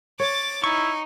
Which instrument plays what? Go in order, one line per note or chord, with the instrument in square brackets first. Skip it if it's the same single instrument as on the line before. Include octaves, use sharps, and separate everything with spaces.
[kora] C#5 [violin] D6 A6
[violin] D#4 [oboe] E4 [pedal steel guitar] C#6